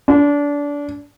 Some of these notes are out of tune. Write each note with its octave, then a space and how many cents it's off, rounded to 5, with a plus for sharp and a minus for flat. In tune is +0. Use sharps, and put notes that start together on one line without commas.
D4 -25